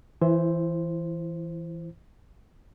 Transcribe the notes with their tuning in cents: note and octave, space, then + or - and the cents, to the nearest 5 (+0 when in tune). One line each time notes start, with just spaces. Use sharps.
E3 +0 E4 +35 C5 +0